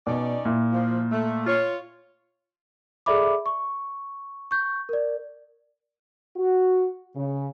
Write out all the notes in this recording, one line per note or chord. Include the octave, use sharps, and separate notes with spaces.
B2 C#4 D#4 D5
A#2 E4
F3
A3
F4 C#5
G#4 A4 D5 E5 B5 D6
C#6
C#6 G6
A#4 D5
F#4
C#3